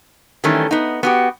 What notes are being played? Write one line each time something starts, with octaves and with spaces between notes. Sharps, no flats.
D#3 E3 G3 A3 C#4
B3 D#4
B3 F#4 G4